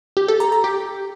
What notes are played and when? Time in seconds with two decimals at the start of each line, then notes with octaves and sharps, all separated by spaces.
0.17 G4
0.28 A4
0.40 A#5
0.52 A#5
0.64 G4